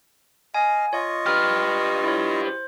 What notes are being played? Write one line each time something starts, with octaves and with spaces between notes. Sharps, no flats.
D#5 F5 G#5
F4 C#5 D#5 C#6
G4 B4 F6
E4 C#5
C5